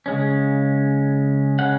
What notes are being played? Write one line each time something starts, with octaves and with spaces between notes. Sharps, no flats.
C#3 G#3 C#4
C#3 G#3 C#4 F#5